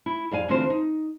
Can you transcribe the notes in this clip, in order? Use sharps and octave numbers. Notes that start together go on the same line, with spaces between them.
E4
F2 D5 F5 G#5
D2 D3 E3 C4 F4 C5
D#4